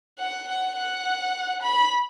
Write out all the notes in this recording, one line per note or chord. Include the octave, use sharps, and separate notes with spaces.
F#5
F#5
F#5
B5